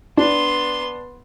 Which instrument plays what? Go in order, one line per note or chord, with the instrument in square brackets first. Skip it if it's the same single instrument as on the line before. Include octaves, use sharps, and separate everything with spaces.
[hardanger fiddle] B3 C6 [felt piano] D4